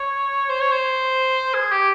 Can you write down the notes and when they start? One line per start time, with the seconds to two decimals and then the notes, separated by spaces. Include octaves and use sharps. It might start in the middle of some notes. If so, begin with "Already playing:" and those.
Already playing: C#5
0.49 C5
0.60 C#5
0.71 C5
1.54 G#4
1.71 G4